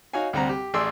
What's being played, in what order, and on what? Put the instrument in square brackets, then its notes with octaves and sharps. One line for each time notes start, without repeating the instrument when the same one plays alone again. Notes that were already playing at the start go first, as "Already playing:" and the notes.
[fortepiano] D#4 F#4 C#5 F5 G#5
D2 C3 G3 C4 F#5 A#5
G4
A1 G#4 D5 C6 E6